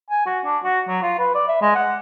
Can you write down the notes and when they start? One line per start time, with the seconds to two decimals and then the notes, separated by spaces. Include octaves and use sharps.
0.10 G#5
0.26 F#4
0.45 D4
0.64 F#4
0.88 F#3
1.03 F4
1.19 B4
1.35 D5
1.48 E5
1.61 G#3
1.75 F#5